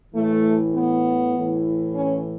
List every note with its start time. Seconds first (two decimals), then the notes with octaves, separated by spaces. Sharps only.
0.14 A2 E3 A3
0.75 B3
1.34 A2 E3
1.95 C#4